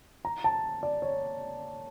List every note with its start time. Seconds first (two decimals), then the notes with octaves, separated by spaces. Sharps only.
0.25 A#5
0.44 A5
0.83 D5
1.02 C#5